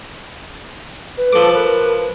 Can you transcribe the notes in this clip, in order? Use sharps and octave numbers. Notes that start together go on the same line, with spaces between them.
B4
F3 A4 D6
A#4 B4